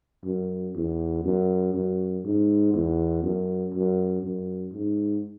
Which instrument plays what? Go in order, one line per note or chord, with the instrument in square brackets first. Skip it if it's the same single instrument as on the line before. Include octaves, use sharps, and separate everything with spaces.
[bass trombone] F#2
E2
F#2
F#2
G#2
E2
F#2
F#2
F#2
G#2